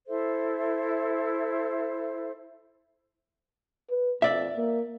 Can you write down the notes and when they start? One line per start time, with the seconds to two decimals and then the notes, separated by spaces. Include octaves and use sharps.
0.07 E4 A4 C5 E5
3.90 B4
4.22 F2 D5 E5
4.57 A#3